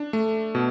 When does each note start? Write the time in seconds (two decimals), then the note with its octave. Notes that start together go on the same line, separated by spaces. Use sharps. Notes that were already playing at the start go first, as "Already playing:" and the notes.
Already playing: D4
0.13 A3
0.55 B2